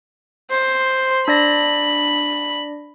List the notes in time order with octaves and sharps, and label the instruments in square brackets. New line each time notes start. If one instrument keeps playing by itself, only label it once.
[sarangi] C5
[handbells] D4 D5 A#6 [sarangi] B5